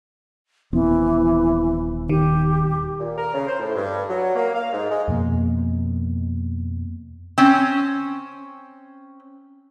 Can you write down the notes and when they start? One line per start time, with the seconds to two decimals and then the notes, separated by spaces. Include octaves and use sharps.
0.73 D#1 E3 B3 C4
2.09 D#3 G4
2.99 A#2
3.18 A#4
3.34 C#3
3.47 C5
3.60 A2
3.75 G2
4.09 F#3
4.35 A#3
4.55 F5
4.73 G#2
4.90 G#3
5.08 F2 B2 A#3
7.38 C4 C#4